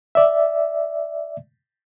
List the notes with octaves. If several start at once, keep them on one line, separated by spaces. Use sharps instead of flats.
D5 E5